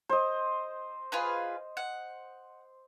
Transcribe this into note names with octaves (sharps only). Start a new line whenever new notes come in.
C5 D#5
F4 G#4 B4
F#5